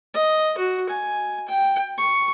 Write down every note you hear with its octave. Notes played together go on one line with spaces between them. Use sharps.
D#5
F#4
G#5
G5
C#6